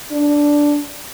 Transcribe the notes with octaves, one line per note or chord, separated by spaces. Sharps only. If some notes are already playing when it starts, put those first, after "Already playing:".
D4